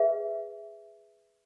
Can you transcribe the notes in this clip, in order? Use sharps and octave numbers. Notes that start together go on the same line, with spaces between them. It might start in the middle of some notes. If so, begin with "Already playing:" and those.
Already playing: G#4 B4 E5